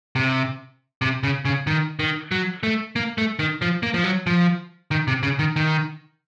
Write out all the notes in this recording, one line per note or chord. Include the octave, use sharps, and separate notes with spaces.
C3
C3
C#3
C#3
D#3
D#3
F#3
A3
A#3
A3
D#3
F3
A#3
F3
F#3
F3
D#3
C3
C#3
D#3
D#3